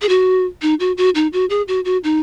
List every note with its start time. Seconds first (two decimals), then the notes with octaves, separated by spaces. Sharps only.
0.02 G#4
0.09 F#4
0.62 D#4
0.80 F#4
0.97 F#4
1.15 D#4
1.33 F#4
1.50 G#4
1.68 F#4
1.85 F#4
2.04 D#4